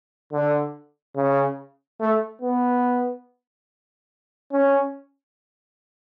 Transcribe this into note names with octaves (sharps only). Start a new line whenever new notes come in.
D3
C#3
A3
B3
C#4